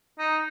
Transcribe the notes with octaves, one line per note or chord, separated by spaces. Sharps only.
D#4